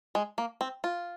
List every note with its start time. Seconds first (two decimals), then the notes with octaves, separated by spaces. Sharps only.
0.15 G#3
0.38 A#3
0.61 C4
0.84 F4